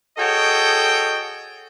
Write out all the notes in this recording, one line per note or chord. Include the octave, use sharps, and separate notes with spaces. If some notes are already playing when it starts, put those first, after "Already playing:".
F#4 G#4 A4 C#5 D#5 G5